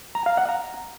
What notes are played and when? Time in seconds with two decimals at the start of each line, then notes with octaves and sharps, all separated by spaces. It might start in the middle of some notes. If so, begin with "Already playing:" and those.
0.15 A#5
0.26 F5
0.37 F#5
0.49 A#5